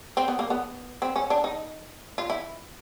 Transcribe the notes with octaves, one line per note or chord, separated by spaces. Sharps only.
C4
B3
A#3
B3
C4
C#4
D4
D#4
F4
E4